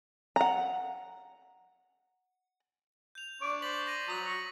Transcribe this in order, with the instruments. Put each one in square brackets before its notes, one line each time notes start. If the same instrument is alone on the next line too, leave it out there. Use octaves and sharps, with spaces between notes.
[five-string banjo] F#5 A#5
[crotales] G6 F7
[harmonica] D4 D5 C#6 [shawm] D6
[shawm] C5 [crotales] A6 B6 F#7
[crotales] A#6 D#7
[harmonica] F#3 A#5 [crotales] D#6 B6
[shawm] C#6